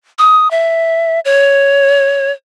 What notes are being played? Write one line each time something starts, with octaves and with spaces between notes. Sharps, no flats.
D#6
E5
C#5